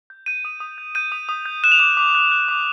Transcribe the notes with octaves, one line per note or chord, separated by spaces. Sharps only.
G6
G6 D#7
D#6
D#6
G6
G6 D#7
D#6
D#6
G6
F#6 E7
F7
D6 E7
D6
F#6
F#6
D6